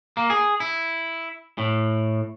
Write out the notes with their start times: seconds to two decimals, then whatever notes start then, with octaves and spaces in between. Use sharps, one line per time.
0.17 A#3
0.30 G#4
0.60 E4
1.58 A2